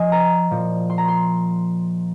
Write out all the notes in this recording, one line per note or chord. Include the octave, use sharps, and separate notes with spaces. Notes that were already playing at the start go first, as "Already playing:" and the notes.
Already playing: F3 D#5 G#5
A#5
A#2 F3
C6
A#5
C6